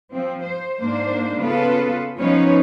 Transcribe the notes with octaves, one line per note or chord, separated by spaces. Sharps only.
F3 C4
C5
G#2 A#3 D4 C5
C#3 B3 F4 A4 B4
F3 B3 C#4 D#4 B4 C#5